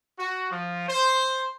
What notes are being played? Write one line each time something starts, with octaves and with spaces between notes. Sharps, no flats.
F#4
F3
C5